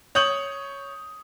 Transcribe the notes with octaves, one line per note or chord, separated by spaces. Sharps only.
C#5 D#6 G6 F#7